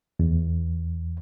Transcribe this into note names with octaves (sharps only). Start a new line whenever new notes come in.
E2